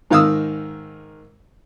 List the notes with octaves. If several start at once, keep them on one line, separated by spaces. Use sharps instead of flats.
G#2 D#3 F5 D#6 E6